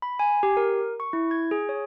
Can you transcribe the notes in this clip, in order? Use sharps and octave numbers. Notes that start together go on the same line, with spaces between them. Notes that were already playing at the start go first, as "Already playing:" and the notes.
B5
G#5
G4
A#4
C#6
E4
G#6
G#4
C#5